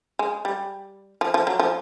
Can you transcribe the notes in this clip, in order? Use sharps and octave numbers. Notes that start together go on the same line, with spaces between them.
G#3
G3
F3
F3
F#3
F3